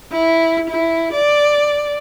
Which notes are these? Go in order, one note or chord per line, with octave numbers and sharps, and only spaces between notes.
E4
E4
D5